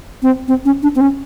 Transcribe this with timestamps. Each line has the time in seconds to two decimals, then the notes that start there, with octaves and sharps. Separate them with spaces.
0.22 C4
0.48 C4
0.65 C#4
0.83 D4
0.96 C4
1.01 C#4